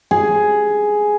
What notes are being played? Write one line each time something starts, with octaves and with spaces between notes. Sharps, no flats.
G#4